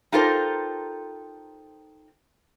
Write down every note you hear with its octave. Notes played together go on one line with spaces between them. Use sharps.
D#4 F4 G4 A4 A#4 C5